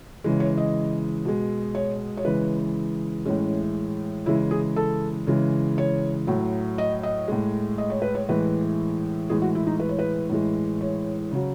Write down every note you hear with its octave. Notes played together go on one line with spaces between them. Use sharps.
C#3 E3 G#3
C#5
D#5
B2 G#3
C#5
C#5
C#3 E3 G#3 B4
A2 E3 G#3 C#4
C#3 E3 G#3 E4
G#4
A4
C#3 E3 G#3
C#5
A2 F#3
D#5
D#5
A2 G#3
D#5
C#5
B4
C#5
A2 E3 G#3 B4
A2 E3 G#3 G#4
F#4
E4
D#4
B4
C#5
B4
A2 E3 G#3
C#5
C#3 F#3